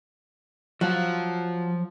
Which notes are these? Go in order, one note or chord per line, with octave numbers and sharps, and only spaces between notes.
F3 F#3 F4